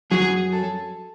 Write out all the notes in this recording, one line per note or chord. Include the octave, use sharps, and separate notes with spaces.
F#2 F#3 G#4
A4